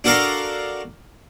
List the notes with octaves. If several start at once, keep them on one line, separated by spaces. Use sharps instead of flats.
D4 F#4 A4 A#4 F5 A#5